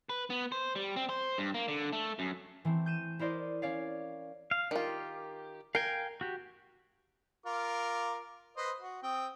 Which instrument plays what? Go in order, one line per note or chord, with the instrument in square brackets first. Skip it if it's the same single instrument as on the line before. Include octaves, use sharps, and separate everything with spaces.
[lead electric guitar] B4
B3
C5
G3
C4
C5
G2
A#3
D3
A3
F#2
[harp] E3 A3 C4
G6 D#7 E7
E4 A#4 C5 D5 D#5
C#4 C#5 D5 F5
[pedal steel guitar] F5
[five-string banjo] D#3 F4 [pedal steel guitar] G4
[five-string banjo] A#4 [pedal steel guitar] F5 G5 G#5
[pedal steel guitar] F#4 G4
[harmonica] F4 A#4 D6
B4 C5 D#5
F#4
C4 G5 D#6